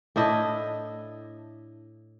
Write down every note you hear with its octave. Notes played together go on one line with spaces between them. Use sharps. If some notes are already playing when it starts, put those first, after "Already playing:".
A2 D4 E4 D#5